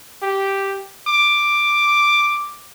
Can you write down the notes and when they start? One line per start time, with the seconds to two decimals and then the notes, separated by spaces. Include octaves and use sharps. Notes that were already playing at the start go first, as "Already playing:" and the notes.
0.22 G4
1.08 D6